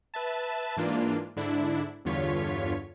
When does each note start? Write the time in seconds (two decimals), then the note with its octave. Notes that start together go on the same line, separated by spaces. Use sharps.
0.14 B4 E5 A5
0.77 G#2 E3 A#3 D4 F4
1.36 G#2 D3 D4 E4
2.05 E2 G2 D3 F4 C#5 B6